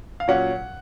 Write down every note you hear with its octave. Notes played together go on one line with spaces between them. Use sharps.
F5
A#2 F#3 C#4 F#5